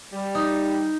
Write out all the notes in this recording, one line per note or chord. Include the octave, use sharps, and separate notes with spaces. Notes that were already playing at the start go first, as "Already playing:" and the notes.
G3
D#4